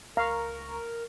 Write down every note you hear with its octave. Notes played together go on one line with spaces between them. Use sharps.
C#2 A#4 F5 A#5 C#6